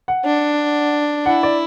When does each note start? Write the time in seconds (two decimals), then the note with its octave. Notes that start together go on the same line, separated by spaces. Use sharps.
0.08 F#5
0.25 D4
1.25 E4 F#5
1.43 D5